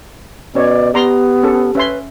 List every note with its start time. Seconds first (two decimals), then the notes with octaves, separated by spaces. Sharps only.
0.55 B2 C#4 C#5 D5
0.94 B3 G4 D5 A#5 C6
1.43 C#4 A4
1.75 C#4 B4 E5 C6